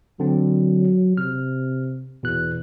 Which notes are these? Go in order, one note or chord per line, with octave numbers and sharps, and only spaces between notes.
D3 F#3 C4
C3 F6
E2 B2 F#6